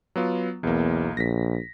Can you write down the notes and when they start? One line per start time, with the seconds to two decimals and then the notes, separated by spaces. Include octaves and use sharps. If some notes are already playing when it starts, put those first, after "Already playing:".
0.16 F#3 B3 F4
0.63 B1 E2 A#3
1.17 A#1 A#6 B6